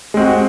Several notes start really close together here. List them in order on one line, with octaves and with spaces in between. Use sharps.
G#3 C4 F#4